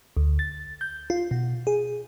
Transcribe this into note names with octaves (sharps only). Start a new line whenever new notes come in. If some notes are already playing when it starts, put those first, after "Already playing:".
D2
A6
G6
F4
B2
G#4